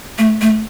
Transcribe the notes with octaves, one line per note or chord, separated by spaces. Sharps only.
A3
A3